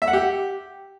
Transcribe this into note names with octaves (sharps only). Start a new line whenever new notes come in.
E5
F#5
G4